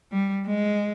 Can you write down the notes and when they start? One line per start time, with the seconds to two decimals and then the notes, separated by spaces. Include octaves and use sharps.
0.12 G3
0.46 G#3